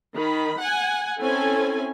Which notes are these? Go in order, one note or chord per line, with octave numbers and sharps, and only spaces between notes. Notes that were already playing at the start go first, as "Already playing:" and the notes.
D#3 B5
F#5 G#5
C4 C#4 E4 A4 G#5